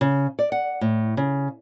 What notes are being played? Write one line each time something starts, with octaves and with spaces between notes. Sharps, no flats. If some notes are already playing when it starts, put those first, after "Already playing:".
C#3
D5
F#5
A2
C#3